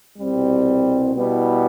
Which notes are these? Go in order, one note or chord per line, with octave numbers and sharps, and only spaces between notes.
C2 B2 G3 C4
B2 G3 B3 E4